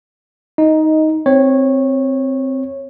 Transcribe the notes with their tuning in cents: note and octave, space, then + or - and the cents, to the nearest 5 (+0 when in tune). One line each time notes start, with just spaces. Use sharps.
D#4 +10 D#5 +0
C4 +0 C#5 -15